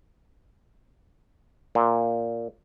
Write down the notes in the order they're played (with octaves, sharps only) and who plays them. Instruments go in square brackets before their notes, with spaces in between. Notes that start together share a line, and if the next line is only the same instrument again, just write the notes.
[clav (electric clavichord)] A#2